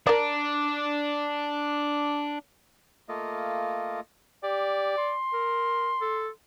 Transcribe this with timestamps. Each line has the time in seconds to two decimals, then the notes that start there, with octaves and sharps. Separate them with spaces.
0.07 D4 A#4 D5
3.09 A3 A#3 F4 D#5
4.44 G4 D5
4.98 C6
5.33 A#4
6.01 A4